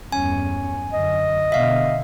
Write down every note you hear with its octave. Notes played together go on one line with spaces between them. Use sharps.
E2 G2 C#4 G#5
F#2 D3 D#5
B2 D3 E5 F5